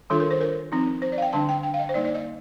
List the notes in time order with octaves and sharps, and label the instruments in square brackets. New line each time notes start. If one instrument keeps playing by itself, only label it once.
[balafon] D#3 G3 D4 F4 A4
A#4
C5
A#4
F3 C4 D#4
C5
D5
F5
G5
D3 G3 D4 A5
G5
G5
F5
D#5
C5
G3 A#3 D#4 D5
D5
D#5